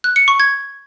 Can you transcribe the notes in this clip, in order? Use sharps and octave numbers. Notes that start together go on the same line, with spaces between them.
F#6
C#7
C#6
G#6